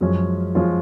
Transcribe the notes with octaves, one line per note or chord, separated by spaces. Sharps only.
F#2 F3 G#3 C#4 F4
F3 G#3 C#4 F4